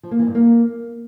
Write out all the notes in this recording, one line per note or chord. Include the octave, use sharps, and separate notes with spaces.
F3
A#3
E3
G2
A#3